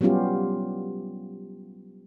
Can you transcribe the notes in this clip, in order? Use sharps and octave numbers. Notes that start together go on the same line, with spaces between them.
F#3 G3 B3 C#4 F4 G4